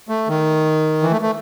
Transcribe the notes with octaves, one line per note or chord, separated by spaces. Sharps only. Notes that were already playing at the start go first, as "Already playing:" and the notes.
A3
D#3
E3
A3
A3